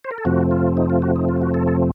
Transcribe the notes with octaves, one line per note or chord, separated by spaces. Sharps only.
C5
A#4
A4
F2 C3 F3 A3 C4 F#4
F4
D#4
F4
F#4
D#4
F4
F#4
A4
A4